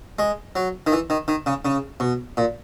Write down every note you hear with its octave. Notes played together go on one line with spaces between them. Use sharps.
G#3
F#3
D#3
E3
D#3
D#3
C#3
C#3
B2
A#2